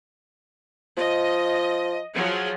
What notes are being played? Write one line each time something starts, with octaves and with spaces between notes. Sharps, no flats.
F3 D#5
F3 F#3 G#4